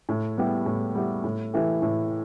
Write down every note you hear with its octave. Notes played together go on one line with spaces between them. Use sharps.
A2
G3 B3 E4 G4
A2
G3 B3 E4 G4
A2
E3 A3 E4 G4
A2